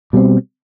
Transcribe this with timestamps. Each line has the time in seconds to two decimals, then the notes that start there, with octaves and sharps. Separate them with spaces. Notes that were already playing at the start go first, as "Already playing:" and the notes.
0.13 B2 G3 C4